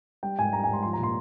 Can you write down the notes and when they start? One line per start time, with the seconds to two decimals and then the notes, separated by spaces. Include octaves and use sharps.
0.23 G3 G5
0.39 G#2 G#5
0.53 G3 A#5
0.64 G#5
0.69 G#2 C6
0.83 F3 C6
0.93 A#5
0.98 A#2
1.03 C6